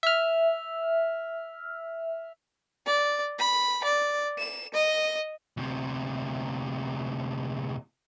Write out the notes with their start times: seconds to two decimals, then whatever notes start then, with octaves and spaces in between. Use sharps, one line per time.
0.03 E5 F6
2.87 D5
3.39 B5
3.83 D5
4.39 E7
4.74 D#5
5.57 D2 C3